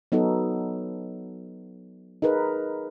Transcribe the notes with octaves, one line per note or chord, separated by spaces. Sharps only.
F#3 B3 D#4 F#4 A4
D#4 G#4 A#4 B4